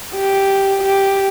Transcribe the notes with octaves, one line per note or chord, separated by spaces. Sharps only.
G4
G4